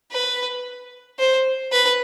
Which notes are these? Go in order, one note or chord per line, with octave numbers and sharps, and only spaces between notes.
B4
C5
B4